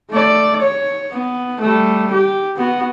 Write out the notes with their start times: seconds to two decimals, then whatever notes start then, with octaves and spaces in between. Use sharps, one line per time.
0.11 A3 D5
0.61 C#5
1.11 B3
1.61 G3 A3
2.12 G4
2.57 B3 F#4